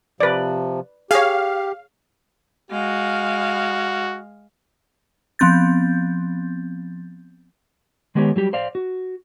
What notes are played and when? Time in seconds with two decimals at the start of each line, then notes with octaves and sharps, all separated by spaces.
0.20 C3 F3 B4 D5
1.11 G4 G#4 C#5 F5
2.71 G#3 F#4 F5
5.39 F3 B3 C4 G6 A6
8.15 D#3 G#3 B3 G4 G#4 C#5
8.36 F#3 G3 G4
8.53 C5 D5 F5
8.75 F#4